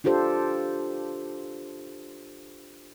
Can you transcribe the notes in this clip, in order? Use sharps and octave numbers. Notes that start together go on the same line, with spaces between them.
D4 F4 G4 A4 C5